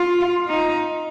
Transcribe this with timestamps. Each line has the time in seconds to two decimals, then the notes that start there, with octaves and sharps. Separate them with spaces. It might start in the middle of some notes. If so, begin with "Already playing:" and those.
Already playing: F4
0.48 D#4